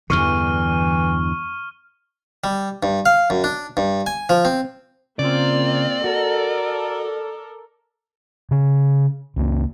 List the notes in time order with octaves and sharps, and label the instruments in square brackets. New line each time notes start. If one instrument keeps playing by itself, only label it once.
[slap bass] E2 G2 D3 [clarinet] E3 [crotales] C#6 F6 D#7
[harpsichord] G3
G2
F5
F#2
D4
G2
G#5
F3
C4
[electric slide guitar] C#3 [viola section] A#3 C4 F4 [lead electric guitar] D5
[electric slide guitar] F#4 [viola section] A4 A#4
[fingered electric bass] C#3
C#2 A#3